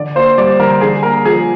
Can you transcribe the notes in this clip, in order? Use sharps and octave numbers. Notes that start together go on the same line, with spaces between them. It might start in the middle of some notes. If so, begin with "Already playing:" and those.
Already playing: D3 D5
A#3 C5
G3 D5
D3 A#4
D3 G#4
A#3 A#4
F3 G#4